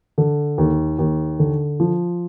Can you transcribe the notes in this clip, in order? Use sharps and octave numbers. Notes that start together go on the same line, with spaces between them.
D3
D#2
D#2
D3
F3